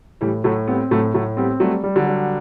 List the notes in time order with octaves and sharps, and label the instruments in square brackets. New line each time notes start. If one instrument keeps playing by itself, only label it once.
[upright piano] A2 [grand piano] E3 G3
[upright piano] A2 [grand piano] F#3 A3
[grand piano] G3 B3 [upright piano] C4
[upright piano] A2 [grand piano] F#3 A3
[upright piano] A2 [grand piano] F#3 A3
[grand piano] G3 B3 [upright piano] C4
[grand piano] F#3 A3 [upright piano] G3
[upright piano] G3
[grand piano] D3 F#3
[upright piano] G3